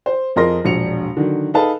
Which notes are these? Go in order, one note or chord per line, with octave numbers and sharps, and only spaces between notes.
C5
F2 G#4 A#4 D#5 C6 A#6
E1 A#1 C#7 F7
D3 D#3 F#3
D#4 G#4 A4 B4 F5 A5